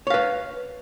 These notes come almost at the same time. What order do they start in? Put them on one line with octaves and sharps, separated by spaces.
C#5 F5 B4